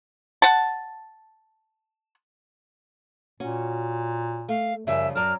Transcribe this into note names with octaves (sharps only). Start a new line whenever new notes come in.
F#5 A5
A#2 C#4 F#4
A3 F5
F#2 C#3 F3 G3 E5
F#2 F#3 D5 A5 F6